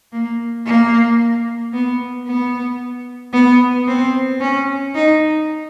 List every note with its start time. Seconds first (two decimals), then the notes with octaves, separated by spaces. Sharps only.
0.13 A#3
0.66 A#3
1.73 B3
2.26 B3
3.33 B3
3.87 C4
4.40 C#4
4.94 D#4